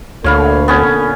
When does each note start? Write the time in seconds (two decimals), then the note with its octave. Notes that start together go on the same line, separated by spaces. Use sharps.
0.24 D2 A#2 D3 A4 C#5 F5 B5
0.68 B3 C#4 C#5